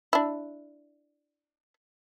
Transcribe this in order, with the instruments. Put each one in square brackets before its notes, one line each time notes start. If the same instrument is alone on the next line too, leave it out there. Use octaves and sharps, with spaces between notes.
[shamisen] D4 E4